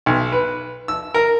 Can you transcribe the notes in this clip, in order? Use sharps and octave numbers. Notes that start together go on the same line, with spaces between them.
B1
B4
E6
A#4